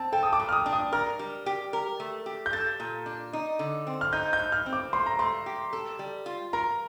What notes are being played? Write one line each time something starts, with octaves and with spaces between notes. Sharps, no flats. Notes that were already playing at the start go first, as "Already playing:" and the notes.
Already playing: C4 A5
A4 G5
D#6
D6
A#2
F6
D#6
D4
D#6
A#4 F6
G3
G4
A#4
A3
G4
G6
A4 A6
A#2
D4
D#4
D3
C4
F6
D#4 G6
G6
A2
F6
C4
D6
A3 C6
A#5
A3 C6
G4
A4
G3
F4
A#4 A#5